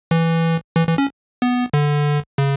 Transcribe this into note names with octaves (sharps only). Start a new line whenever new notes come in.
E3
E3
E3
C#4
B3
D3
C#3